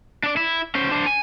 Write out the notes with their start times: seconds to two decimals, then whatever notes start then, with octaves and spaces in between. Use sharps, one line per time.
0.23 D4 D5
0.37 E4
0.75 C#4 C5
0.91 D4 C5
1.06 G#5